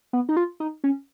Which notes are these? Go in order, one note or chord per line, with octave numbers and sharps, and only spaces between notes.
B3
D#4
F4
D#4
C#4